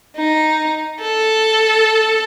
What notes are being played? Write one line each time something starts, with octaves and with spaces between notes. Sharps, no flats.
D#4
A4